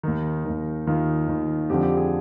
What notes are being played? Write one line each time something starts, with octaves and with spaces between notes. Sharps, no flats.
D#2 D#3 D#4
D#2 D#3
D#2 D#3 F4
D#2 D#3
F2 D3 F3 G4
G4
G#4